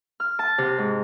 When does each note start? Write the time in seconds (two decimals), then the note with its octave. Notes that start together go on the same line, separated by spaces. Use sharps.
0.20 F6
0.39 A5
0.58 C3
0.78 G#2